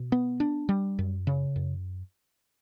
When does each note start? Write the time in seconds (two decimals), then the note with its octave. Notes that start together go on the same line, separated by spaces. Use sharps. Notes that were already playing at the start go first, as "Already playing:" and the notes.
Already playing: B2
0.12 B3
0.40 D4
0.69 G3
0.99 F#2
1.27 C#3
1.56 F#2